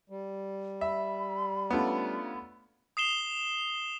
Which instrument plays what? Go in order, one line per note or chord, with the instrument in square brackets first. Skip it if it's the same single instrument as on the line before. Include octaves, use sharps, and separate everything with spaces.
[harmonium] G3
[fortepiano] E5 [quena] B5
[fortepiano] A3 B3 [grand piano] C#4 D4 F4
[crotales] D#6 C7 E7 G7